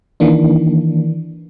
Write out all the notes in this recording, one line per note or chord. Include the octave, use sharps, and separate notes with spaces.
D#3 E3 A#3 D4